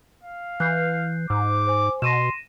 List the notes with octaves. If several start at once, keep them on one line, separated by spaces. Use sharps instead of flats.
F5
E3 F#6 G6 C7
G#2 D6
C5 G#5
B2 C6 A#6 D#7 E7